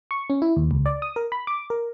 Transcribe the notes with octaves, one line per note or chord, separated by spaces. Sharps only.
C#6
C#4
E4
D#2
C#2
D5
D#6
A#4
B5
D6
A#4